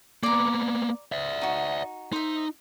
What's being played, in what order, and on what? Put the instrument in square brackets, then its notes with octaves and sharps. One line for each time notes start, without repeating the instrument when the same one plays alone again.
[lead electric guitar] A#3 B3 [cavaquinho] D5 A#5
[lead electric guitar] D5 E5
[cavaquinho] D#4 F#4
[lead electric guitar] D#4 [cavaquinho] C5 E5